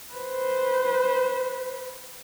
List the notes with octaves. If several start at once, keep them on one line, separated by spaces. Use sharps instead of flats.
B4 C5